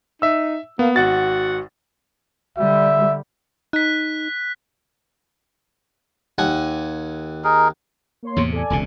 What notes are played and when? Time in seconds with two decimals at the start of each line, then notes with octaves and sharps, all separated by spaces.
0.22 D#4 E5 E6
0.79 A#3 B3
0.96 G#1 F#4 F#5 A6
2.58 D3 G3 E5
3.73 D#4 F#6 B6
6.38 D#2 F#5 G#5
7.44 D#4 G#4 A#4
8.23 A#3 C#5 C6
8.37 E2 A2 C3
8.53 A4 D5 G#5
8.70 E1 C#2 C3